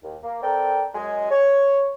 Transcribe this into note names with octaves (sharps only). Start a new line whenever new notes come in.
D#2
A#3
C4 A4 A#4 D5 G5
F#2 G#3 G#5
C#5